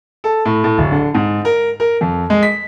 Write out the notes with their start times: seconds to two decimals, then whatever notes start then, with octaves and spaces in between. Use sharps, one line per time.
0.24 A4
0.45 A2
0.64 A2
0.78 D1
0.92 D3
1.15 G#2
1.45 A#4
1.80 A#4
2.01 F2
2.30 G#3
2.43 B6